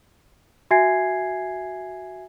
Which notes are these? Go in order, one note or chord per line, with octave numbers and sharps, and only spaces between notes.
F#4 E5 G#5 G#6 C7